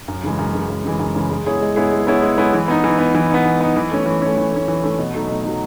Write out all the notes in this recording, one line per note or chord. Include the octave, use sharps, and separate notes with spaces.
F#2
C#3 E3 G#3
F#2
C#3 E3 G#3
F#2
C#3 E3 G#3
F#2
C#3 E3 G#3
G#3
B3 E4 G#4 C#5
G#3
B3 E4 G#4 C#5
G#3
B3 E4 G#4 C#5
G#3
B3 E4 G#4 C#5
E3
B3 D#4
E3
B3 D#4
E3
B3 D#4
E3
B3 D#4
E3
A3 C#4
E3
A3 C#4
E3
A3 C#4
E3
A3 C#4
B2
F#3 A3 D#4
B2
F#3 A3 D#4